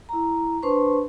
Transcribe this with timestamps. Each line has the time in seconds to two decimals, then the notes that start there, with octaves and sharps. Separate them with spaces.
0.09 E4 A#5
0.63 D4 B4 C5 A5 C6 C#6